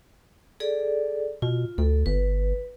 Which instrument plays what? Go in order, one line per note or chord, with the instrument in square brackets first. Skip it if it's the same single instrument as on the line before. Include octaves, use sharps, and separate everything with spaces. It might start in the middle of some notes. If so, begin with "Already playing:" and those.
[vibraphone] G#4 A4 D5
[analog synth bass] B2 [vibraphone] F4
[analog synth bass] D2 [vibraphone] A4
[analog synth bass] G1 [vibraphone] B4